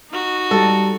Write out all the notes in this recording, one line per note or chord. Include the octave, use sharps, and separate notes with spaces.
D#4 F#4
G3 A4